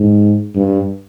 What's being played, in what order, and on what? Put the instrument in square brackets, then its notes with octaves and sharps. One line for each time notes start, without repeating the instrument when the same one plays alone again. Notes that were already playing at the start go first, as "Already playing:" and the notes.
Already playing: [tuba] G#2
G2